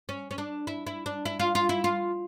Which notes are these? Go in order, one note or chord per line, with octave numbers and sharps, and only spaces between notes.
C#4
C#4
D4
E4
E4
D4
E4
F4
F4
E4
F4